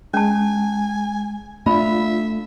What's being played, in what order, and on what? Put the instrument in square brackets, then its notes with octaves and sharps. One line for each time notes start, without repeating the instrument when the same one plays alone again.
[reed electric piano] G#3 [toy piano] C#4 A5 [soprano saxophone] G#5
[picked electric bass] A3 [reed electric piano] D4 F4 [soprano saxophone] E5 [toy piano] B5